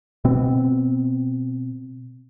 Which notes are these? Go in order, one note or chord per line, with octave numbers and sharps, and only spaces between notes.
B2 B3 C4